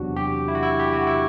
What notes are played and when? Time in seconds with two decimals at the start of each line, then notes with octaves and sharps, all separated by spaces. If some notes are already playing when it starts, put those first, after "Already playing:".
Already playing: E2 C3 F#3 D4 F#4
0.16 G4
0.48 E4
0.55 F#4
0.63 E4
0.80 G4
0.93 F#4
1.07 E4